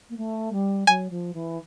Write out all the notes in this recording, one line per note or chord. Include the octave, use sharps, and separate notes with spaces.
A#3
A3
G3
F#3 G#5
F3
E3